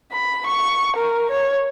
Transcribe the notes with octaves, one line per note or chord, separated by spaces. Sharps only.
B5
C#6
A#4
C#5